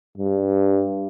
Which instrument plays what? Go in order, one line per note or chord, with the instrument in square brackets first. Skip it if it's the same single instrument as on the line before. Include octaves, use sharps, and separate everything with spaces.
[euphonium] G2